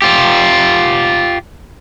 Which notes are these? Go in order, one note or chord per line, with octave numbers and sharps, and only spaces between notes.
F4 G4